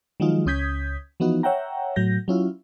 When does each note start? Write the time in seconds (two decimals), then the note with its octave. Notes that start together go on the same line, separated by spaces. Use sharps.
0.20 D#3 F3 F#3 G#3 D#4 F4
0.46 C#2 C#4 D#6 G6 G#6 B6
1.20 E3 F3 B3 D#4 F#4
1.43 C#5 E5 F#5 G5 A#5
1.96 A2 F#3 G6 A#6
2.28 F#3 C#4 E4 F4